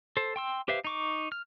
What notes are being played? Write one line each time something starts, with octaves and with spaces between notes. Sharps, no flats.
A4 C5
G5 C6 E6
G4 B4 C5 E5 F5
D#4 C#6 D6
F6